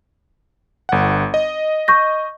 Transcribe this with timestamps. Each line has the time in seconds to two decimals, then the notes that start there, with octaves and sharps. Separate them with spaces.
0.89 G1 F#5
1.34 D#5
1.88 C#6 G6 A#6